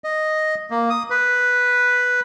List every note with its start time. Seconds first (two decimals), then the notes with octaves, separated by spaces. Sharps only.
0.04 D#5
0.70 A#3
0.90 D#6
1.10 B4